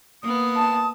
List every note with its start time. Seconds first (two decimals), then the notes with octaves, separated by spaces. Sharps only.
0.22 A#3 B3 D#6
0.57 A5